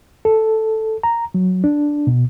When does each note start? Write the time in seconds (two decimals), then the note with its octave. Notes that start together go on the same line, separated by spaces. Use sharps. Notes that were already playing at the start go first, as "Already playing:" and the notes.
0.25 A4
1.03 A#5
1.34 F#3
1.64 D4
2.07 B2